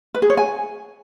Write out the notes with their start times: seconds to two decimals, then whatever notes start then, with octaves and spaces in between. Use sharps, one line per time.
0.14 B4
0.22 G#4
0.30 C#5
0.37 G#5